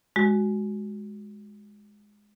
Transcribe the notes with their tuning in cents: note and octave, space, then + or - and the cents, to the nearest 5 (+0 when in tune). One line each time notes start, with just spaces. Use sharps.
G#3 +0 F#4 +0